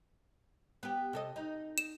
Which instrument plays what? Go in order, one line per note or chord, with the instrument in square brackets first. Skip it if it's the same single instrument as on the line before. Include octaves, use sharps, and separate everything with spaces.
[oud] B3 G4
C3 A4 D#5
D#4
[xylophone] E7